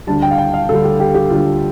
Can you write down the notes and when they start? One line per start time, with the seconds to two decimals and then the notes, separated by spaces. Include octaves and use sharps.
0.07 D2 D3 G3 A5
0.22 G5
0.31 F5
0.38 G5
0.54 F5
0.68 D2 D3 G3 A4
0.84 G4
1.00 G4
1.14 G4
1.30 D2 D3 G3 F4